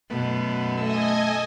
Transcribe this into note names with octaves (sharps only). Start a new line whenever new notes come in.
F#2 B2 A3 B3
A3 A4 D#5 G#5 E6